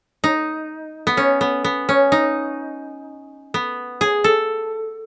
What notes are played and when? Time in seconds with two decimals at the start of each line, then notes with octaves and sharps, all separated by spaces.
0.24 D#4
1.07 B3
1.17 C#4
1.41 B3
1.64 B3
1.89 C#4
2.12 D#4
3.54 B3
4.01 G#4
4.24 A4